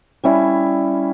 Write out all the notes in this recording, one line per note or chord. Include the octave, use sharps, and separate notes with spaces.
G3 C#4 E4